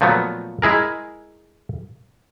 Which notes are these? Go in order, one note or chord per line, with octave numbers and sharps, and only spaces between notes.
A#2 F3 F#3 A3 B3
G#3 E4 G#4 A#4